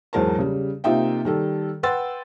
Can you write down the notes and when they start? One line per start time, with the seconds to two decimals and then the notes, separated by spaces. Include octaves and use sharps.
0.13 E2 G#2 F#3 A#4 C5 A5
0.38 C#3 G3
0.84 C3 A#3 D#4 F4 E5 G5
1.25 D#3 G3 A4
1.83 B4 F#5 G5 C6 E6 A6